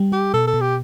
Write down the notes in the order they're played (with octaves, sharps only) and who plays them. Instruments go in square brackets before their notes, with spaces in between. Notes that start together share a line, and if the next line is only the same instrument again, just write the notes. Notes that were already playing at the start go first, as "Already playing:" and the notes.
Already playing: [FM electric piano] G3
[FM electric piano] G3 [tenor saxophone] G4
[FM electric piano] B2 [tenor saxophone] A4
[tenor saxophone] A4
[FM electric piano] B2
[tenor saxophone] G4